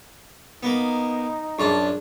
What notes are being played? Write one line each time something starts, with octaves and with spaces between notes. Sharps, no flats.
A#3 B3 D#4
F#2 D4 F4 G4 G#4 A5